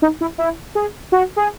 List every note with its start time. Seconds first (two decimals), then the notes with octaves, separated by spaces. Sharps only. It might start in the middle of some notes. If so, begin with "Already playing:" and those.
0.02 D#4
0.21 E4
0.38 E4
0.75 G#4
1.12 F#4
1.36 G#4